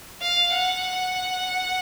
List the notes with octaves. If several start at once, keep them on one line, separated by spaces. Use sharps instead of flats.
F5
F#5